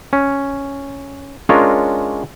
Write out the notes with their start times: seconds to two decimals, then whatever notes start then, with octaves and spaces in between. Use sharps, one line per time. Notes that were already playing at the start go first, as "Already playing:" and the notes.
0.13 C#4
1.49 G#3 C#4 D4 F4 A#4 C#5